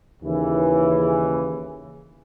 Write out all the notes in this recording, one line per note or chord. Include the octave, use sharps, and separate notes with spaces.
D#2 C#3 E3